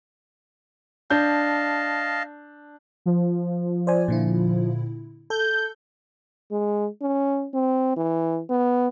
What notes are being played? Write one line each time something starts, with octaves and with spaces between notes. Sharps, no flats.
D4 D#5 F5 A5 G6
F3
C5 D5 G#5
A#2 D3 E4
A4 G6
G#3
C#4
C4
E3
B3